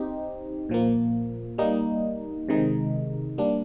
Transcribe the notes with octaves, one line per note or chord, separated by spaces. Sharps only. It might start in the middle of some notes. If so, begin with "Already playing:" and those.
Already playing: C4 D#4 G4
A#2 F3 A#3
G3 A#3 D#4
C3 D#3 G#3 D#4
G3 A#3 D4